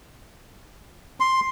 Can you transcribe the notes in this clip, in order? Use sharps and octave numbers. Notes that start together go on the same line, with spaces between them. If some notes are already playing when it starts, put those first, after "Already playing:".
C6